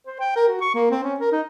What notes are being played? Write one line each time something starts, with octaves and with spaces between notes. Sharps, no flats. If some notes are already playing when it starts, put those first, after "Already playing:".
C5
G5
A#4
F#4
C#6
A#3
C4
C#4
A#4
D#4